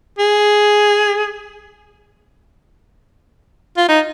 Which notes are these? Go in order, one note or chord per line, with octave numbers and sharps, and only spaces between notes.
G#4
F4
D#4